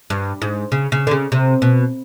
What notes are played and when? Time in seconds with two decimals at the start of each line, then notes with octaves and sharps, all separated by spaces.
0.10 G2
0.42 G#2
0.72 C#3
0.92 C#3
1.07 D3
1.11 C#3
1.32 C3
1.62 B2